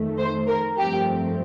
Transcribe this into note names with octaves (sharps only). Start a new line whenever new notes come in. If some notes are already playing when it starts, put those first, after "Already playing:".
Already playing: F2 D#3 A3
C5
A#4
G2 F3 A3 C4 G4